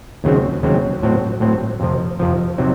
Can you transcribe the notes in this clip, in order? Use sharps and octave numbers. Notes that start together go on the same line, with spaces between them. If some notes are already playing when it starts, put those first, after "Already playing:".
D#2 C#3 F#3 C4
D#2 C#3 F#3 C4
A2 F#3 C4
A2 F#3 C4
F2 C3 F3
F2 C3 F3
C3 F#3 C4 D#4